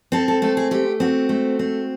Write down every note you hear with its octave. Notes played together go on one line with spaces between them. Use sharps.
C4 A4
A4
A3 A4
G#4
A3 G4
C4 F#4
A3
C4